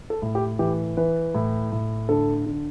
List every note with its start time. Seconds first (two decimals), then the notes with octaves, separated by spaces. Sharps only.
0.10 A4
0.22 A2
0.35 G4
0.59 E3 G4
0.97 E3 B4
1.35 A2
1.72 A2
2.09 D3 A4
2.46 D3